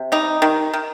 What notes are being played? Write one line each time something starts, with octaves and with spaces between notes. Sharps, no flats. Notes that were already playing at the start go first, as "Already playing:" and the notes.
Already playing: C3
G3 D#4
D#3
D#3